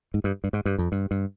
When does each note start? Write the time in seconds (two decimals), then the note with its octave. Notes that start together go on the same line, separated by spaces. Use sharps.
0.14 G#2
0.24 G2
0.44 G2
0.53 G#2
0.65 G2
0.78 F2
0.92 G2
1.11 G2